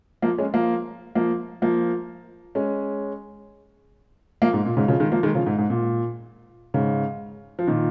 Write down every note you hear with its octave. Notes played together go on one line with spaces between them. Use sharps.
F3 A#3
G#3 C#4
F3 A#3
F3 A#3
F3 A#3
G#3 C#4
F3 A#3
G#2
A#2
G#2 C#3
C#3 F3
D#3 G#3
F3 A#3
D#3 G#3
C#3 F3
G#2
G#2
A#2
G#2 C#3
F3
A#2 D#3